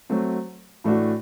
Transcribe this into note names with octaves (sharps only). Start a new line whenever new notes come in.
F#3 A3 C4 F#4
A2 E3 A3 D4 F#4